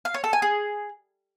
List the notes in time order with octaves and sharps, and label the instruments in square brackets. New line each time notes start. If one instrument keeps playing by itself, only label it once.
[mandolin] F5
C#5
A4
G#5
G#4